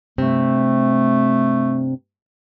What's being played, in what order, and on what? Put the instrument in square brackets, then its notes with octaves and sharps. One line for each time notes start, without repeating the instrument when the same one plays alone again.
[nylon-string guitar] G2 C3 C4 [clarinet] A3